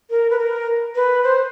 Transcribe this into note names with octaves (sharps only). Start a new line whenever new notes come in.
A#4
B4
A#4
B4
C5